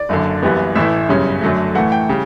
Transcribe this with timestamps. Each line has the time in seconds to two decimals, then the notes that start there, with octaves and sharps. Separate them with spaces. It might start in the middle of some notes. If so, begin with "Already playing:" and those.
Already playing: D5
0.09 F#1 F#2 D3
0.42 F#1 F#2 E3 G3 B3
0.75 A1 A2 E3 A3 E4 E5
1.09 G1 F#2 C#3 G3 C#4
1.41 F#2 D3 F#3 A3
1.75 A2 E3 A3 F#5
1.92 G5
2.09 C#3 G3